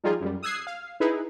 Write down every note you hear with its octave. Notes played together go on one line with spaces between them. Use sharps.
F3 G3 D#4 F4 G#4
F#2 G3
D#6 E6 F#6 G#6 C7
F5
D#4 E4 G#4 B4